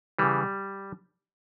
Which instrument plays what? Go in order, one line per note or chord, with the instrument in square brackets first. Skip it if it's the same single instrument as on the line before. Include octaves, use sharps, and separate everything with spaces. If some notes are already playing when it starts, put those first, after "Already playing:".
[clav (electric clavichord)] C#3 E3 G3